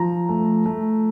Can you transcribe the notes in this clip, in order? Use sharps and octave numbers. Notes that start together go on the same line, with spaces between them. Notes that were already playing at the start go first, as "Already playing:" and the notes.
Already playing: F3 A#5
A3
A3